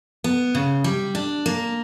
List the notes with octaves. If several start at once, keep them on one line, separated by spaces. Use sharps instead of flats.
B3
C#3
G3
D4
A#3